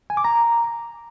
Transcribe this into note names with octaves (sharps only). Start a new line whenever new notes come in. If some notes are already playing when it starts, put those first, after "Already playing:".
G#5
D6
A#5